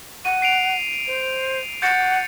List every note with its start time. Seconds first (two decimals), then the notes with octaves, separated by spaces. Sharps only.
0.25 F#5 D#7
0.42 C7 D7 F7
1.07 C5
1.82 F#5 G6 A6 C#7